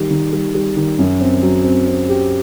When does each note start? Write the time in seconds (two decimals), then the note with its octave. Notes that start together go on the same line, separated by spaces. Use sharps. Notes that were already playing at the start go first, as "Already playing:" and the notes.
Already playing: D#3 G3
0.11 D#3
0.33 G3
0.55 G3
0.77 D#3
0.99 F#2
1.21 C4
1.43 F#3
1.64 C4
1.87 C4
2.09 G4